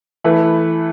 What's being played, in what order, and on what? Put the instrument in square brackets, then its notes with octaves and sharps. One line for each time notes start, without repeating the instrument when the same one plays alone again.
[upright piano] E3 A3 E4 B4